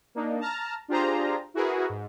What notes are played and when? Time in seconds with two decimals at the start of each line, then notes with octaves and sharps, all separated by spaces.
0.15 A#3 D4 D#4
0.40 A5 A#5 F6
0.88 D4 F4 G4 G#4 C5 A#5
1.54 E4 F#4 G#4 A#4 B4
1.90 G#2